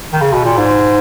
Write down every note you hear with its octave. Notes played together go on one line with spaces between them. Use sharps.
D#3
C#3
B2
A#2
G#2